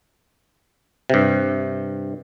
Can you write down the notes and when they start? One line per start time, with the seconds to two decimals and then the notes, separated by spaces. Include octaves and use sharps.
1.10 G2 C3